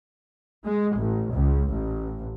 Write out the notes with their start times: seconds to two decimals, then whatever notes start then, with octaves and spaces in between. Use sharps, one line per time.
0.64 G#3
0.97 A1
1.32 C#2
1.70 A1